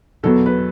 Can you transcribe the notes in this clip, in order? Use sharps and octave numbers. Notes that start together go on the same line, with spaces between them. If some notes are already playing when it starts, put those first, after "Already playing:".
E2 B2 F#3 B3 A4
B4